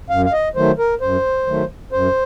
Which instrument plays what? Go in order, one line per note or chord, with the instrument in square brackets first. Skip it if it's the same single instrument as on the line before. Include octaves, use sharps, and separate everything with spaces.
[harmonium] F#2 F5
F5
D#5
D#3 F#3 A3 C5
A#4
F#2 C5
D#3 F#3 A3
F#2 C5